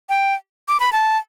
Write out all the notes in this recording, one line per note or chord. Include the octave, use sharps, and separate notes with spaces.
G5
D6
B5
A5